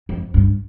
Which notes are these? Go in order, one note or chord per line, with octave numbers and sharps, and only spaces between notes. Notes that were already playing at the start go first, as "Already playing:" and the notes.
F2
G2